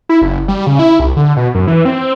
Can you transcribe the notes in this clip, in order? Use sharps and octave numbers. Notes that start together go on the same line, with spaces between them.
E4
F#1
G3
C#3
E4
C2
D3
B2
F#2
E3
C4